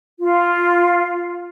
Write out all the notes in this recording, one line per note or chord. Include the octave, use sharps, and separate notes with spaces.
F4